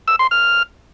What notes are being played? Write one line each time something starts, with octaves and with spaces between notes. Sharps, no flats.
E6
C6
F6